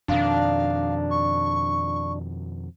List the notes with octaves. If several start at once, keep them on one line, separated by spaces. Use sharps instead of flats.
F2 B2 D#3 D4 F5
C#6